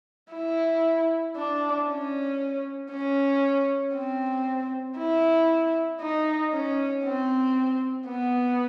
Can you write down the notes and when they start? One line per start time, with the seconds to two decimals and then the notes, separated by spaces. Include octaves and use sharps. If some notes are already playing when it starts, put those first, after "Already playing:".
0.32 E4
1.36 D4
1.87 C#4
2.91 C#4
3.94 C4
4.98 E4
6.01 D#4
6.53 C#4
7.05 C4
8.08 B3